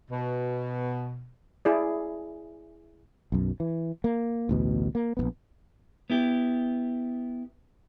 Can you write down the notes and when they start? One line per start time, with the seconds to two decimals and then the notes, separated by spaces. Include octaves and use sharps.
0.10 B2
1.65 E4 G#4 D5
3.32 B1 F#2
3.60 E3
4.04 A#3
4.49 A1 D2 B2
4.95 A#3
5.17 A#1 F2 B3
6.10 B3 E4 G4